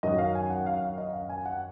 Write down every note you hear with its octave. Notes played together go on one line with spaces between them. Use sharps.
F#2 D#3 F#3 D#5
F5
G#5
F#5
F5
F5
D#5
F5
G#5
F#5